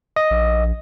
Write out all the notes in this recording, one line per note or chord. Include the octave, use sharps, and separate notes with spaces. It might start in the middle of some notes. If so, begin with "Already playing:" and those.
D#5
A#1